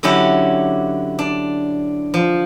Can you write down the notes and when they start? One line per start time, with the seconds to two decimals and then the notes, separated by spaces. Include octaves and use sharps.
0.03 D3 F#3 C#4 E4 G4
1.19 D4
2.14 F3